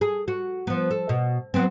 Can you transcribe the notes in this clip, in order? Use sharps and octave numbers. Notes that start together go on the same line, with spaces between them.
G#4
F#4
F3 B3
A4
B2
F#3 B3 C4